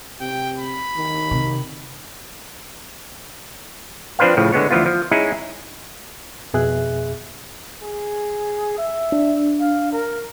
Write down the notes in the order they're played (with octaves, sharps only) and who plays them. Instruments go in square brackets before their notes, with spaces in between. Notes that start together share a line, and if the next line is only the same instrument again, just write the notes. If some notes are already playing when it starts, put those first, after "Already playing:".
[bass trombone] C3 [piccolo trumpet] G5
[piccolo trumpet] B5
[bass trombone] D#3
[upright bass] C3 C4
[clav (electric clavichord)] F3 C4 D4 B4 C5 F5
A2 C#3 F3
D3 G#3 B3 C#5
D2 E3 F3 B3 F4
F3
G#3 C#4 D#4 E4 G#4
[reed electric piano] F2 B2 G#4 E5 F#6
[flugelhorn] G#4
E5
[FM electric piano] D4
[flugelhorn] F5
A#4